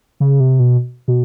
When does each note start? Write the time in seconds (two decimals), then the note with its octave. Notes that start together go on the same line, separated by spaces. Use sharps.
0.20 C#3
0.40 C3
0.60 B2
1.08 B2